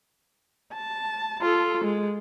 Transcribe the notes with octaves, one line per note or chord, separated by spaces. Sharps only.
A5
F4 A4
G#3